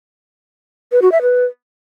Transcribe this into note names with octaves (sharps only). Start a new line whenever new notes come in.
B4
F#4
E5
B4